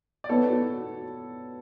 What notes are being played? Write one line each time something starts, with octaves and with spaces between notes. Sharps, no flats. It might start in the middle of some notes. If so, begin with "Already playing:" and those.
D5
B3 A4 C#5
F#4